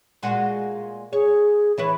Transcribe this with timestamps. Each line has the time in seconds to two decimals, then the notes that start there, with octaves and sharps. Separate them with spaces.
0.23 A#2 G#3 F#4
1.13 G#4 C#5
1.78 E3 E4 B4 C#5